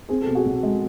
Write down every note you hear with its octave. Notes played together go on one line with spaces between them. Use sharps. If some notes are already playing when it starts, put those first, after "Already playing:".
C4 G#4
A4
B2
F#4 G#4
B1
G#3